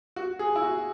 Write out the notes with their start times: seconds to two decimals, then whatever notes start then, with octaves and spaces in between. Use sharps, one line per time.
0.16 F#4
0.39 G#4
0.56 E4
0.62 F#4